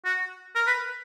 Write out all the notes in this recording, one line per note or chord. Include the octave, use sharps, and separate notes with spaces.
F#4
A#4
B4